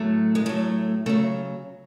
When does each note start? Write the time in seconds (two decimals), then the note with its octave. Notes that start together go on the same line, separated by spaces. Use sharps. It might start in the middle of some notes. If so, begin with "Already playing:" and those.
Already playing: A2 F#3 A3
0.35 G#3
0.46 A2 F#3 A3
1.06 C#3 F#3 A3